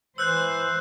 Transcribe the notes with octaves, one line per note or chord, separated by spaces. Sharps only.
E3 C5 E6 F#6 G6